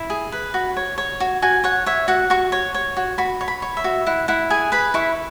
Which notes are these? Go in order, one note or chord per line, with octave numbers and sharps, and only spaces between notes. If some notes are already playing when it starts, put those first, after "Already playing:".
Already playing: E4
G#4
B4
F#4
C#5
C#5
F#4
F#4 G#5
C#5 F#5
C#5 E5
F#4 F#5
F#4 C#6
C#5
C#5
F#4
F#4 B5
C#5
B5
C#5
E5
F#4
E4 F#5
E4 F#5
G#4 G#5
B4 B5
E4 C#6